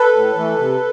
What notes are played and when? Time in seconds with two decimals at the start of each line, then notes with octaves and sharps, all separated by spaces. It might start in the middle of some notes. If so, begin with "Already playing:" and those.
Already playing: A4 B4
0.13 A2
0.35 E3 A3
0.58 C3